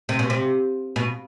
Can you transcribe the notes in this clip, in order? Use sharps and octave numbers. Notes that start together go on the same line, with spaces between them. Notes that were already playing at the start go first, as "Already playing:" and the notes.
C3
B2
C3
B2